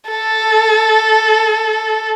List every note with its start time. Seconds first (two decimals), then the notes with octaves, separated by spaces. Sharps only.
0.11 A4